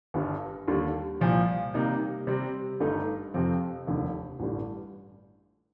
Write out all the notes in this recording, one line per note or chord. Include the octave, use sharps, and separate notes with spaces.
G1 G2 D3
D#2 D3 G3
C2 A#2 F3
C3 G3 A#3 D#4
C3 G3 C4
G1 G2 D3 A3 D#4
F2 C3 F3 C4
F1 D#2 D3
A1 G2 D3